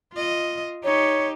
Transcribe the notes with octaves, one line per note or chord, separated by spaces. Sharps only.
F4 D#5
D#4 G4 C#5